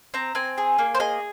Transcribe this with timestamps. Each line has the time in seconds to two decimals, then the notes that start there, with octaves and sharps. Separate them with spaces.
0.14 C4 A#5
0.35 C4 G#5
0.58 G#4
0.78 A#3
0.95 C5
1.00 G#4 D#5